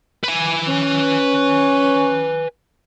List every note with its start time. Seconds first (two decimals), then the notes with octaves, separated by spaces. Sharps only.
0.24 B4 G#5
0.68 C#4